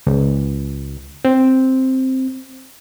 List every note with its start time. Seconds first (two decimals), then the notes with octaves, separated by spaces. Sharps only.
0.07 C#2
1.25 C4